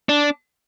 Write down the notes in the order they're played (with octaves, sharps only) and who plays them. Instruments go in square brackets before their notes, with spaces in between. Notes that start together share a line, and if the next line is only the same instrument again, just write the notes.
[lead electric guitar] D4